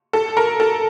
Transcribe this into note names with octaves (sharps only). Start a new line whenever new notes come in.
A4
A#4
A4